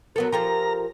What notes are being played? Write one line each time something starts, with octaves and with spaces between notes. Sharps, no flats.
F#3 B3 A4 A#4
F3 G4 A4 A#5